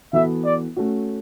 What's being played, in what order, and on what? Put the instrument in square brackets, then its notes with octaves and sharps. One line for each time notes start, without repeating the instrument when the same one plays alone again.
[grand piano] E3 B3 F#4 A4 [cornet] E5
[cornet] D5
[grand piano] A3 C#4 F#4